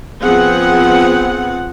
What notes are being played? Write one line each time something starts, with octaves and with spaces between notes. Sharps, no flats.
F3 B3 C4 G#4 F#5